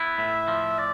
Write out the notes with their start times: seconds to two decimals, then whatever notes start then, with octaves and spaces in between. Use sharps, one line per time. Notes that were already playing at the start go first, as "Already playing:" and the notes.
Already playing: B3 E4
0.18 A2 E5
0.48 F3
0.78 D5